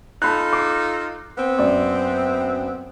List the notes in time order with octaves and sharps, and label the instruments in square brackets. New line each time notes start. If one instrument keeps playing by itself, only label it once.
[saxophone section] D#4 F4 A4 [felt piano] A5 B5 F#6
[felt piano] D6 C7
[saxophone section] B3 C4
[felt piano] F#2 D5